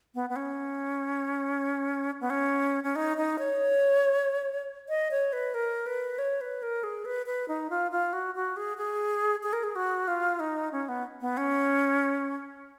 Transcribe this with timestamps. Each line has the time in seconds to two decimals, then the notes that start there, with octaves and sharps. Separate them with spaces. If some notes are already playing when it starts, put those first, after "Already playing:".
0.15 B3
0.30 B3
0.36 C#4
2.21 B3
2.30 C#4
2.84 C#4
2.96 D#4
3.17 D#4
3.39 C#5
4.89 D#5
5.11 C#5
5.33 B4
5.54 A#4
5.86 B4
6.18 C#5
6.41 B4
6.62 A#4
6.83 G#4
7.05 B4
7.26 B4
7.48 D#4
7.70 F4
7.91 F4
8.13 F#4
8.35 F#4
8.57 G#4
8.77 G#4
9.43 G#4
9.53 A#4
9.63 G#4
9.76 F#4
10.08 F4
10.40 D#4
10.72 C#4
10.89 B3
11.21 B3
11.37 C#4